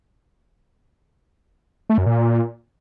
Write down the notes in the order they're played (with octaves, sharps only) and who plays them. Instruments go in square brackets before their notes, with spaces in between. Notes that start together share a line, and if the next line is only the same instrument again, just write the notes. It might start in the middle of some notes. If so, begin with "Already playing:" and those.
[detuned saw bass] A3
F#2
A#2